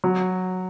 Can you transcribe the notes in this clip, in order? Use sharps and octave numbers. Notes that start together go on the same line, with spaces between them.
F#3